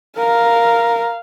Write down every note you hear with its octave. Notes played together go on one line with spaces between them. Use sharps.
A#4 F5